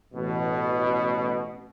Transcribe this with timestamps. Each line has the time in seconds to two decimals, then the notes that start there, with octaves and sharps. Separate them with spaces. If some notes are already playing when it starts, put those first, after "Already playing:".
0.14 A1 B2